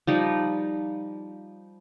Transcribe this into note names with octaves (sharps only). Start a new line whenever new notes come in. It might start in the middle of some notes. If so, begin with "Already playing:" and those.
F3 G3 D#4